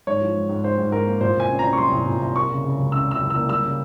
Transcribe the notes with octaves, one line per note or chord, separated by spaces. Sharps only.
G#2 C#5
F3
G#2
G#2
G#2 C5
G#2
G#2 A#4
A#3
A#2 C5
C2 G#5
C#4
C#4 A#5
C#6
G3 C6
C2
A#2
C2
A#3 C#6
C#3
C#3
C#2
C#3 E6
C#3 E6
C#2
A#3 E6
G3 E6
C#3